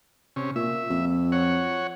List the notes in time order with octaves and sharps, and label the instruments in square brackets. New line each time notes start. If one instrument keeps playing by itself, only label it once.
[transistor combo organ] C3 C#4
[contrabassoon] A#2 [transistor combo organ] E5
[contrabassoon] F2
[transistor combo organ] C#5 F#5